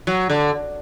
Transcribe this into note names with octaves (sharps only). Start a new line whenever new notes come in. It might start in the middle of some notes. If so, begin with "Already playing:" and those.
F#3
D3